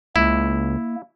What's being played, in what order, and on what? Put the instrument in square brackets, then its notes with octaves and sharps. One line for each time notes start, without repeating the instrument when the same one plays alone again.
[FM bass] C#2 [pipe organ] A#3 [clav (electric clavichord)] E4